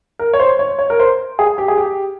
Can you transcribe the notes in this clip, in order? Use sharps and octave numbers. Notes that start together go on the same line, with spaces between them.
A#4
C#5
C5
C#5
C#5
A#4
C5
G#4
G4
G#4
G4